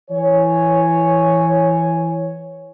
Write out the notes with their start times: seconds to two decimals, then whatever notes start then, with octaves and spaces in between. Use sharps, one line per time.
0.11 E3 C#5 G#5